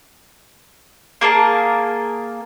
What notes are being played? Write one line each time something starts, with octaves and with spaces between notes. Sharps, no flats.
A#3 G#4 A#4 A5